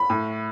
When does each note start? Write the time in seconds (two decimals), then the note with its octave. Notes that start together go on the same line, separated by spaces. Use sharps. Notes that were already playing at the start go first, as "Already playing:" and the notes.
Already playing: B5
0.10 A2